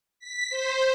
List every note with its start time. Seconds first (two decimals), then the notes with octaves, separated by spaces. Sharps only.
0.20 B6
0.50 C5